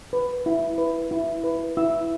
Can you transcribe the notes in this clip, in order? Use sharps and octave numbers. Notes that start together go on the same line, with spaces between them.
B4
E4
B4
E4
B4
E4 E6